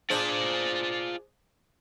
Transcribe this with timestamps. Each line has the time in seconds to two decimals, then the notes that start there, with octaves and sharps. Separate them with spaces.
0.10 D4 F4 G#4 C5 D5